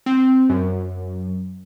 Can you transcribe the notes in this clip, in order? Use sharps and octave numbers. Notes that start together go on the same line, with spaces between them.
C4
F#2